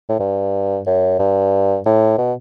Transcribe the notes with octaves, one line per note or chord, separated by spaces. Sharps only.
A2
G2
F#2
G2
A2
B2